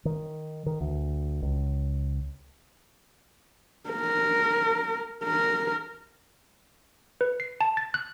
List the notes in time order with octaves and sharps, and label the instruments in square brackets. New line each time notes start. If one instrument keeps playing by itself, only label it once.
[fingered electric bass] D#3
D#3
D2
C#2
[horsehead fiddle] A#4
A#4
[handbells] B4
C7
A5
A6
F#6